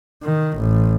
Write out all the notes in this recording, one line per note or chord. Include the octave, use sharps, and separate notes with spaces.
D#3
A1